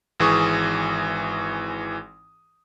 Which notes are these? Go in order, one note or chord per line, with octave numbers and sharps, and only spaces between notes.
G#1 E3 G#4 C#6 D#6